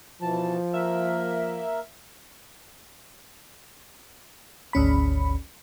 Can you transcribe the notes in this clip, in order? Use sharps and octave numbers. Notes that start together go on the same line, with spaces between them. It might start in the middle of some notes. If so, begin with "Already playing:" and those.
B2 E3 F3 A5
A#3 A#4 E5
G#1 D2 C#4 B5